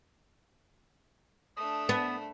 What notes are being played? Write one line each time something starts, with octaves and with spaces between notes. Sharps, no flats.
A3 D4 D#6
B3